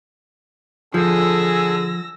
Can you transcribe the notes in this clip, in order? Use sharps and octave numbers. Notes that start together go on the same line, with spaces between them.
D3 F3 G#4 A4 G#5 A5 E6 A#6